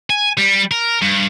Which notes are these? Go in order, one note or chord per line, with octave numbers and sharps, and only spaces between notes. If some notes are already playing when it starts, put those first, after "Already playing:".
G#5
G3
A#4
G2